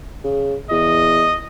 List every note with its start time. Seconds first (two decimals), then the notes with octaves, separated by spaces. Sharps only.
0.24 C#3
0.71 E2 D#5